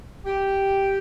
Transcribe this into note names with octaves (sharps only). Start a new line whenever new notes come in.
G4